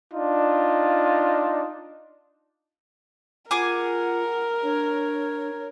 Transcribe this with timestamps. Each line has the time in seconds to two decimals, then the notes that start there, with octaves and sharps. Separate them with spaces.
0.13 D4 D#4 F4
3.51 F4 G#4 A#4 F#5 G#5 D6
4.63 D4 C#5